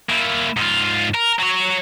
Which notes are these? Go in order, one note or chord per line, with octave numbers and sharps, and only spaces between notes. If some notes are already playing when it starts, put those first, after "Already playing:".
A#3 E4
G#2 F4
A#4
F#3 C#5